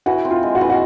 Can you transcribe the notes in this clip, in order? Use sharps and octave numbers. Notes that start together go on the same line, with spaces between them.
E3 F#4
C4
F4
G#3
F#4
E3
F#4